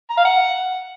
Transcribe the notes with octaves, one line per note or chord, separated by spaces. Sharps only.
A#5
F5
F#5